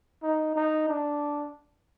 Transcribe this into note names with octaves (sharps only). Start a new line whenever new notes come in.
D#4
D#4
D4